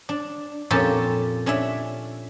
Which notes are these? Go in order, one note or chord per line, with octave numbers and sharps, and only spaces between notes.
D4
F2 A#2 C#4 G4 A4 A5
C#4 D4 C#5 E5